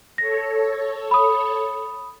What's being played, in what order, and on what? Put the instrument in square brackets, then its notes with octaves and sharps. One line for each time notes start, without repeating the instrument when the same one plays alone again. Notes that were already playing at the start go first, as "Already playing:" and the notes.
[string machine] A4 C#5 [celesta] A#6
[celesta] B5 D#6